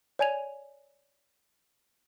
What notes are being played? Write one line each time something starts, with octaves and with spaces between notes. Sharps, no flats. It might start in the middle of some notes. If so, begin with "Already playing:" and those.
C#5 D5 G#5 G#6 D#7 F7